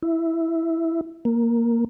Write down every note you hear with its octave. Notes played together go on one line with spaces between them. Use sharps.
E4
A#3